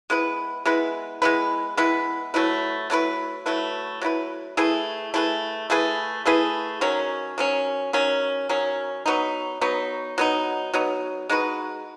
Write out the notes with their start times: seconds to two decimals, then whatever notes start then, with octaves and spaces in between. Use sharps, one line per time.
0.10 G#3 B3 E4 B4
0.66 G#3 B3 E4 B4
1.22 G#3 B3 E4 B4
1.77 G#3 B3 E4 B4
2.34 F#3 A3 E4 B4
2.90 F#3 A3 E4 B4
3.46 F#3 A3 E4 B4
4.01 F#3 A3 E4 B4
4.57 A3 E4 G#4 B4
5.14 A3 E4 G#4 B4
5.70 A3 E4 G#4 B4
6.26 A3 E4 G#4 B4
6.81 D#3 F#3 C#4
7.38 D#3 F#3 C#4
7.93 D#3 F#3 C#4
8.49 D#3 F#3 C#4
9.06 F#3 B3 D#4
9.61 F#3 B3 D#4
10.18 F#3 B3 D#4
10.74 F#3 B3 D#4
11.29 G#3 D#4 F#4 B4